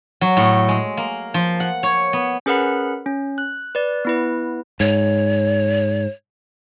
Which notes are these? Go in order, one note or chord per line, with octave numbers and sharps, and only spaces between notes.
F#3
A2
G#3
A#3
F3
F#5
C#5
B3
C#4 G#4 A#4 B4 F#5 B5
C#4
F#6
B4 D5
B3 E4 B4
G#2 C#5